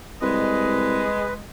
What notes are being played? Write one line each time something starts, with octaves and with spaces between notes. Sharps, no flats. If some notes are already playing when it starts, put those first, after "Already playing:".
C2 G#3 B4 D#5